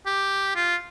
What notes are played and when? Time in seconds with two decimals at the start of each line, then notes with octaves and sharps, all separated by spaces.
0.06 G4
0.56 F4